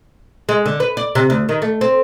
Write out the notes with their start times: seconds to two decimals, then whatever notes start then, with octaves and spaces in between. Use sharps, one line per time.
0.49 G#3
0.66 D3
0.80 B4
0.97 D5
1.15 C3
1.30 D2
1.49 D#3
1.62 A3
1.81 C4